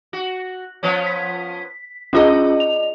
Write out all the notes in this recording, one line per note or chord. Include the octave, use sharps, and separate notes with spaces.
F#4
F3 B3 C#4
B6
C#4 D4 F4 G#4 D#5
F7